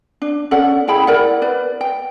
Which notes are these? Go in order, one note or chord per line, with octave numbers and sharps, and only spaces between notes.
D4
C#4 A4 D5 F#5
E4 G#4 G5 B5
E4 A#4 D5 F#5
B4 D5
G5